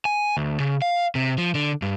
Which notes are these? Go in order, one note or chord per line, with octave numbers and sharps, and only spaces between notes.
G#5
D2
C#3
F5
C3
F3
D3
G2